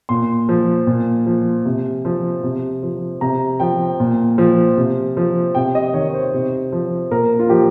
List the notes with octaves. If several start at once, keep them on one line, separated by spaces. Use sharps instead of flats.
A#2 C6
F3
A#2
F3
C3
F3
C3
F3
C3 A#5
F3 G5
A#2
F3
C3
F3
C3 G5
D#5
D#3 C#5
C5
C3
F3
A#2 A#4
F4
F3 G4